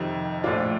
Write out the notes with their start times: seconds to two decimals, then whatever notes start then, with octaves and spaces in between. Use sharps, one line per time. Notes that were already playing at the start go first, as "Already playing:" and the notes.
Already playing: F2 C3 D#3
0.43 A#1 A2 A3 D4 F4